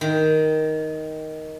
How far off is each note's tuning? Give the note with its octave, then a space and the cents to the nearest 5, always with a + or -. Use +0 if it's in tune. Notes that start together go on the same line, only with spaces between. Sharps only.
D#3 +5